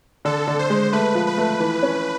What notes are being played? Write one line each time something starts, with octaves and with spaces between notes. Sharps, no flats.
D3 A4
D3
C5
G#3
A3 B4
F3
B4
A3
E3
C#4